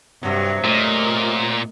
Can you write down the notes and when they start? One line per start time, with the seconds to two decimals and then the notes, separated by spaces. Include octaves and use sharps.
0.23 G2 C3 F#3
0.64 A#2 A3 A#4 D#5